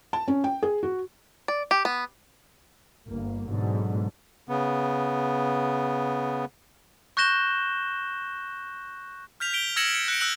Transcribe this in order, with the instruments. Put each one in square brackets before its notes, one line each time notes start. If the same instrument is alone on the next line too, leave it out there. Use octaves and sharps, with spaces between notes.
[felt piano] A5
C#4
G5
G#4
F#4
[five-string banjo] D5
G4
B3
[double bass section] G1 A#3
G#2 B2 D3 F#3
[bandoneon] C#3 B3
[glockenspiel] C#6 F#6 G6 A#6 E7 G7
[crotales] F6 G6 B6 F7
B6 D7 G7
E6 G#6 A#6 C#7 E7 F#7
C#7
F#6 C#7 D7
E6 F#6 F#7